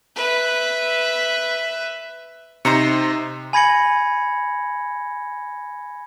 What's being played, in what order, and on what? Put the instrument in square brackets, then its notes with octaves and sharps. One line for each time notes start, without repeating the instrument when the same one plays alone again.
[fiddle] B4 E5
[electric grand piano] C3 D#4 [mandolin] C5 A#5 C#6
[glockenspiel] G#5 B5 G#6 A#6 C#7 F#7